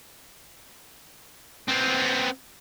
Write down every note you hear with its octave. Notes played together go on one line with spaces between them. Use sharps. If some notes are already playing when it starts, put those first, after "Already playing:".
B3 C4